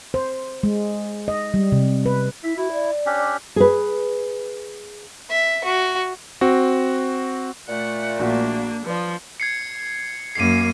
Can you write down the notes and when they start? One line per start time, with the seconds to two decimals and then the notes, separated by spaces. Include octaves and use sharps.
0.14 C5
0.63 G#3
1.28 D#5
1.54 G3
1.72 C3
2.06 B4
2.43 E4 E5
2.57 E4 F#4
2.72 D5
3.06 C#4 D4 G4
3.56 G#4 B4
5.30 E5
5.64 F#4
6.41 C4 F#4
7.69 A#2 A3 F#5
8.19 A#1 A#3 D4 F#4 F#5
8.86 F3 B4 D5
9.40 G#6 C7 C#7
10.35 F#2 A#3 C7 D#7